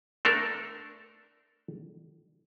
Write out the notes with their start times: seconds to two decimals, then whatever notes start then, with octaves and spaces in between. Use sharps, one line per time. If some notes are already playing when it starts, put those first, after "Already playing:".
0.25 A3 D4 A4 A#4